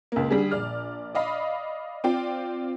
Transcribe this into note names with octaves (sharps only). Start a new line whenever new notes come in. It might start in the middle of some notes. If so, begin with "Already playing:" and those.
C#2 A#3
D3 G3 G#4
A#1 D5 F6
D5 D#5 F5 B5
C4 F4 D5 G5